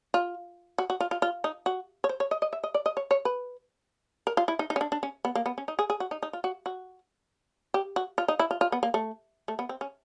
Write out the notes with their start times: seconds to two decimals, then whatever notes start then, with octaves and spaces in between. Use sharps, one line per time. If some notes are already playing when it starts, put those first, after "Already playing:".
0.14 F4
0.78 F#4
0.90 F#4
1.00 F4
1.11 F4
1.22 F4
1.44 D#4
1.66 F#4
2.04 C#5
2.09 C5
2.20 C#5
2.31 D#5
2.42 D#5
2.53 E5
2.64 D#5
2.74 D5
2.86 D#5
2.97 C#5
3.11 C#5
3.25 B4
4.27 A#4
4.37 F4
4.48 E4
4.59 D#4
4.70 D#4
4.76 C#4
4.81 D4
4.92 D4
5.03 C#4
5.25 B3
5.35 A#3
5.46 B3
5.58 C#4
5.68 D#4
5.79 G#4
5.90 G#4
6.00 F#4
6.11 D#4
6.23 D#4
6.33 F4
6.44 F#4
6.66 F#4
7.74 G4
7.96 F#4
8.18 F4
8.28 D#4
8.39 E4
8.51 F4
8.61 F4
8.72 B3
8.83 A#3
8.94 A3
9.48 A3
9.59 B3
9.69 C4
9.81 C#4